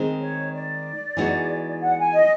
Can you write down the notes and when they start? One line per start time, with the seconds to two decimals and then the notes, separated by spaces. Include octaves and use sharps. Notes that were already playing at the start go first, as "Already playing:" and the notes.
Already playing: D#3 G#3 C4
0.20 C#5
0.52 D5
1.17 E3 G#3 B3 D#4 F#4
1.82 F#5
1.98 G#5
2.13 D#5